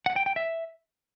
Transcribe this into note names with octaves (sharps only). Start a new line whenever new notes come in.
F#5
G5
G5
E5